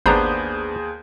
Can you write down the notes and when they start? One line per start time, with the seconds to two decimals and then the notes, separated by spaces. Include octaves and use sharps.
0.06 G#1 D#2 B3 D4 G#4 C5 A#5 G6